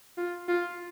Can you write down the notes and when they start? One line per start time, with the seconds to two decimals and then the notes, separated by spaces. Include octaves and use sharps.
0.18 F4
0.48 F4